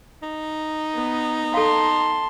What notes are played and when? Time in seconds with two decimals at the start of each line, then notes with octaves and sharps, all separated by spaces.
0.23 D#4
0.95 B3
1.54 A4 F5 A5 C6